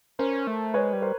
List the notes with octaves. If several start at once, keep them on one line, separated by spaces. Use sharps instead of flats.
C#4 A#4 C5
A3
G#3 B4 C#5
G3
A#4 C5